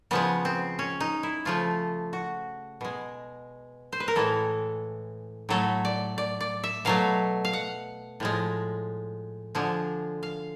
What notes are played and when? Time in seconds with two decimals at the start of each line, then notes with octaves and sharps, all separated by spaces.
0.11 C#3 F3 G#3 B3
0.45 C4
0.79 C#4
1.00 D#4
1.23 E4
1.45 C#3 F3 A3 F4
2.13 F#4
2.81 B2 G#3
3.93 C5
4.00 B4
4.08 A#4
4.16 A2 E3 G#3 A4
5.49 A2 F#3 A3 A4
5.85 D5
6.18 D5
6.41 D5
6.64 E5
6.85 B2 F#3 A3 F5
7.45 F5
7.53 F#5
8.20 A2 F3 G#3
9.55 D3 F3 G#3
10.23 F5